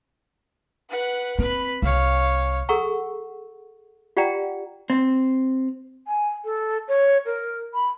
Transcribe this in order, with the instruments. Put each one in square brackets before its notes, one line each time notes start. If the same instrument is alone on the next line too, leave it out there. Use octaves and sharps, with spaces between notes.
[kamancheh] B4 F#5
[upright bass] C4 [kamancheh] B4 B5
[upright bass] C2 [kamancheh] C#5 F5
[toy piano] G#4 A4 F#5 A#5 C#6 E6
F4 G4 D5 F#5 G5 A#5
[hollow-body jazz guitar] C4
[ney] G#5
A4
C#5
A#4
B5